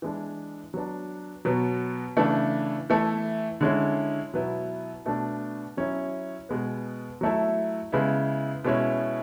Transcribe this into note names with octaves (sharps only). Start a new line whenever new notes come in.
E3 G#3 D4
F#3 B3 D4
B2 F#3 B3
C#3 E3 A3 D4
E3 A3 E4
D3 G#3 C#4 E4
B2 F#3 B3 E4
B2 A3 D4
F#3 C#4 E4
B2 G#3 B3
F#3 A3 E4
C#3 G#3 B3 E4
B2 G#3 C#4 E4